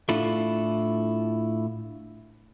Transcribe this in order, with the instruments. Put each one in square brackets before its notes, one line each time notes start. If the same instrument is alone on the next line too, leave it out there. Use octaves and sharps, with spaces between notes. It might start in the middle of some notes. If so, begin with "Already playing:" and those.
[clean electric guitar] A2 D4 E4 F4 A4